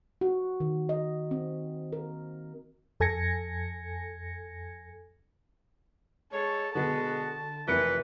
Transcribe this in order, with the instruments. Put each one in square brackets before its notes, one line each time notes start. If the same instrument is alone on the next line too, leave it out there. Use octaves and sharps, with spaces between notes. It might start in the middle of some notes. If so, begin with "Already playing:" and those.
[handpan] F#4
D#3
D#5
C4
A#4
[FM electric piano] F2 A4 G#5 G#6 A#6 C#7
[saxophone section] G#3 C#5 [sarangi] A4
[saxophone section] B2 G#3 B3 [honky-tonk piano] D3 [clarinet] F#4 [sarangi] A5
[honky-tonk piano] F1 A#4 C#7 [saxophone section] E3 [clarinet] B4